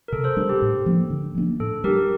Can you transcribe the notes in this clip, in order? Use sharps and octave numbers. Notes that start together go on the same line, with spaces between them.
A#4
C3 A4
A4 C5
G3 D4
G4
A2
F3 A#3 D4
D3
F3 A#3 D4
A2 A4
G3 D4 G4 A#4